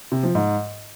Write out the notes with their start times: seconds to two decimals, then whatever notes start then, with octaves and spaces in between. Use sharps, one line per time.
0.12 C3
0.23 F3
0.35 G#2